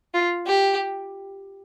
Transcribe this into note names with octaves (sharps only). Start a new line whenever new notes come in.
F4
G4